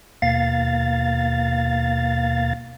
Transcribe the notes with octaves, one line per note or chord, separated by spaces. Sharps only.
D#2 B2 A#3 F5 A6